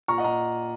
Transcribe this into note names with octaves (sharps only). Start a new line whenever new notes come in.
A#2 A#5 C#6
D#5 F#5
A#2 A#5